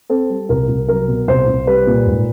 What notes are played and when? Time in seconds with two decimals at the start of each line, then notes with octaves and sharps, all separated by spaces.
0.10 C4 A4
0.30 G3
0.49 C2 A#4
0.69 C2
0.88 F#3 A#4
1.08 B2
1.28 C2 C5
1.47 C2
1.67 G3 B4
1.87 A#2
2.07 G#2